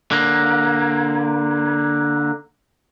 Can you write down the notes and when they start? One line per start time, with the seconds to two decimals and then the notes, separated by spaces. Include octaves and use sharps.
0.11 D3 A#3